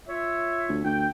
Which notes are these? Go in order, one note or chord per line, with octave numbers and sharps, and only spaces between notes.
F4 C#5 E5
D2
D2 G5